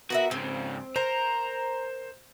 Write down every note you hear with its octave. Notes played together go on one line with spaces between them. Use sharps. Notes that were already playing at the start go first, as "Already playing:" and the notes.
B3 F#4 A#4 E5
G#2 C#3 C4
A#4 C5 A#5